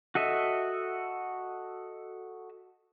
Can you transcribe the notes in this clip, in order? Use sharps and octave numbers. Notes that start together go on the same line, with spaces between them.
F#4 A4 D#5 E5